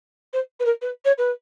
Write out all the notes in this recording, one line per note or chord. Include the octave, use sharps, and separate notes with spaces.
C5
B4
A#4
B4
C#5
B4